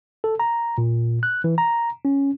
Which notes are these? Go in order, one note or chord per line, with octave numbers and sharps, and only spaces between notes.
A4
A#5
A#2
F#6
E3
A#5
C#4